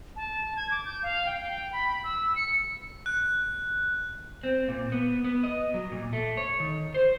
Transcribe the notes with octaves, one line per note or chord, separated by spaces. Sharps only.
A5
G#6
D6
G6
F5
G5
B5
E6
C#7
F#6
C4
A#2
B3
B3
D#5
F#3
A#2
A3
C#5
D#3
C5